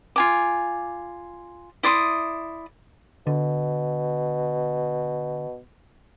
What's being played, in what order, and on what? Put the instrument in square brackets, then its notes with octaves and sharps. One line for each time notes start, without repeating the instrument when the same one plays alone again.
[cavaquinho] F4 G#5 D6
E4 D5 C6 D#6
[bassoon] B2 [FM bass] D3